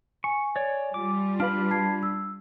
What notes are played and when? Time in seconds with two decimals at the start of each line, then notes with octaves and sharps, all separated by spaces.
0.24 G#5 C#6
0.56 C#5 D5
0.94 G3 F4 D6
1.40 D4 B4 F5 B5 F6
1.71 A5 G#6 C7
2.03 E6